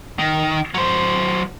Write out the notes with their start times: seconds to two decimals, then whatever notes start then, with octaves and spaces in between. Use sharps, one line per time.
0.19 D#3
0.74 F#3 C5